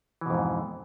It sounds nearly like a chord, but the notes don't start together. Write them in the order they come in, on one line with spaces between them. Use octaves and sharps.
E3 B2 F2 G#2